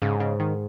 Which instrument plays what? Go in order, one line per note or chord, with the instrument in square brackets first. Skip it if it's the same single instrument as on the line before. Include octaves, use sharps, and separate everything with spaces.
[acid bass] G#2 [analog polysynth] C#3
[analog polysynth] C#3
D#3